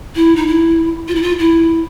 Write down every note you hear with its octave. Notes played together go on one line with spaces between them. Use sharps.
E4
D#4
E4
F4
E4
F4
E4